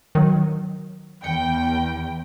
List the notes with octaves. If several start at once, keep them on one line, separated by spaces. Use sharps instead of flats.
D#3 F#3
E2 G5 C#7